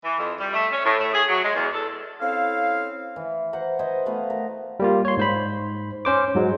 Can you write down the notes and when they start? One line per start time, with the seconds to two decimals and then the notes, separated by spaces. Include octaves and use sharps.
0.04 E3
0.19 F2
0.39 G3
0.54 A3
0.72 C#4
0.85 A2
0.99 A3
1.13 G#4
1.28 F#3
1.44 G#3
1.56 E2
1.73 A4
2.21 C4 C#4 E4 A4 F5
3.16 E3
3.53 B4 C5 F#5 A#5
3.79 C5 D#5 E5 G#5
4.06 A3 B3 B4 F5
4.30 A#4
4.80 G3 A#3 F4
5.05 C#5 C6
5.17 G#2 C5 B5
6.05 C#4 C5 D6
6.35 G#2 F#3 G#3